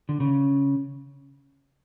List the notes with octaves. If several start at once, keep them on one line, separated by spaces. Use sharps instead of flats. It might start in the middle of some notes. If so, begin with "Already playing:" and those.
D3
C#3